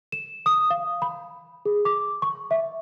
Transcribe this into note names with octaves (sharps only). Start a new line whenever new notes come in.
E7
D#6
F5
B5
G#4
D6
C#6
E5